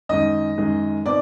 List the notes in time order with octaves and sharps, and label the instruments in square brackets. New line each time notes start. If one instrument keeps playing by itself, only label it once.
[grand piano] F#2 D#3 G#3 D#5 D#6
F#2 D#3 G#3
B2 C4 D#4 D5 D6